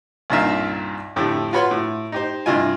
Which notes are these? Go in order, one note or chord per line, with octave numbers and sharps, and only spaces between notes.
C2 G2 A#2 D#4 E5 F5
F2 A2 D3 A3 G4
F4 F#4 B4 C#5 B5 C6
A2
D#4 G4 C5
G2 C3 E4 F4 D#5 G#5